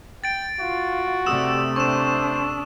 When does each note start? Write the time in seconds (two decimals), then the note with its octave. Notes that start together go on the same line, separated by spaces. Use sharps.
0.24 G5 A6 D7
0.60 F4 F#4
1.26 C3 A3 G4 D5 D#6 E6 E7
1.76 D4 C5 C#6 E7